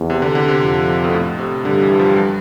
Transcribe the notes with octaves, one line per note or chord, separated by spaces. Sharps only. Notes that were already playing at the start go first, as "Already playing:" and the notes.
Already playing: E2
C3
D3
D3
C3
F2
B2
A2
C3
G2 D3
E3
F3
G3